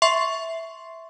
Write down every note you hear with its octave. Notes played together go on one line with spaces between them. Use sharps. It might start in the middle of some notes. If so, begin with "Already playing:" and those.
E5 C6 C#6 C7